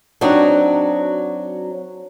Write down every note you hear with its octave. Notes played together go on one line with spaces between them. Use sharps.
F#3 C4 D4 D#4 F#4